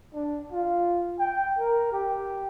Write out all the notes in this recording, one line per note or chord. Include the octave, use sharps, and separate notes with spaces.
D4
F4
G5
A#4
G4